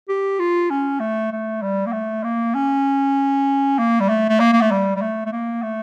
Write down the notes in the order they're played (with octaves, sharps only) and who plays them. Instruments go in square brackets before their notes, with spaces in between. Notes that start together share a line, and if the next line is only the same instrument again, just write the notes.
[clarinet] G4
F4
C#4
A3
A3
G3
A#3
A3
A#3
C#4
A#3
G3
A3
A3
A#3
A#3
A3
G3
G3
A3
A3
A#3
A3